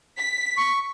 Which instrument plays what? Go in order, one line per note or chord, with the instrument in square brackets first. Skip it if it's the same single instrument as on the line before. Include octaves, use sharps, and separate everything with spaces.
[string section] B6
[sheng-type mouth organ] C#6